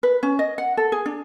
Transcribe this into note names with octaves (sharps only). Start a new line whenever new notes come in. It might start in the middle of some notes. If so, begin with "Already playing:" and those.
B4
C#4
D#5
F#5
A4
G#4
D4